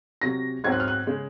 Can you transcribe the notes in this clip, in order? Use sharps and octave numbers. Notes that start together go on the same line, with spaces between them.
C3 F#3 C#4 A#6
G#2 F#3 C4 G#6
F#6
F6
F#6
C#3 G#3